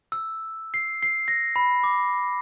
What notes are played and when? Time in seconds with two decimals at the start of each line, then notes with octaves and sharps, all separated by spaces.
0.12 E6
0.74 C7
1.03 C7
1.28 A#6
1.56 B5
1.84 D6